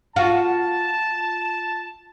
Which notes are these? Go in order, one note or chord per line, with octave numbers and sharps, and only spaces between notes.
F4 F#4 A5